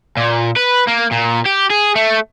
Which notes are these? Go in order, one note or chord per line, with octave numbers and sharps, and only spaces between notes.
A#2
B4
A#3
A#2
G4
G#4
A3